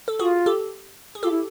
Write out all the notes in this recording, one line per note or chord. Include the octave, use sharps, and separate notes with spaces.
A4
F4 F#4 G#4
G4 A4
G#4
F4 G4 A4
E4